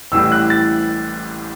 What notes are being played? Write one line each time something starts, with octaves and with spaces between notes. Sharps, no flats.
A1 A2 E3 G3 E6
F#6
A6